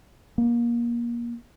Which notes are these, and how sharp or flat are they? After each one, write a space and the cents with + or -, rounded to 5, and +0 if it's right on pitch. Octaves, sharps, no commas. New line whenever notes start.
A#3 +25